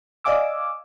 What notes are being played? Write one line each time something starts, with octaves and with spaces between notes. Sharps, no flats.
D5 D#5 F5 G#5 D6 E6